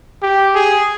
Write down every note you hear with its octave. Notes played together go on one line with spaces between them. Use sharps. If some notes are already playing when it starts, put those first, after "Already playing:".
G4
G#4